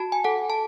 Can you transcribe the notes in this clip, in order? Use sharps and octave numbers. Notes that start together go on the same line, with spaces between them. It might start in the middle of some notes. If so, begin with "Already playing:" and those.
Already playing: F#4 A5
G#5
A4 F#5
A5